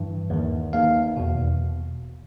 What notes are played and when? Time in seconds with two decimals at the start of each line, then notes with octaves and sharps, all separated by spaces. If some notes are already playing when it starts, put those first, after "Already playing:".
Already playing: G2 E3
0.30 D#2 D#3
0.73 D#2 D#3 F5
1.16 E2 B2